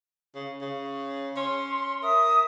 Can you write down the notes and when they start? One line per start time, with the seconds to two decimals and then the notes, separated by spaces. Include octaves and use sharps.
0.35 C#3
0.61 C#3
1.36 C#4 C6
2.02 A#4 E5 D#6